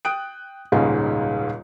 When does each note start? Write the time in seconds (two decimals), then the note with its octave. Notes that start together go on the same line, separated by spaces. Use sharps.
0.05 G5 D#6 F#6 D7
0.72 D#1 C#2 G#2 G#3 C#4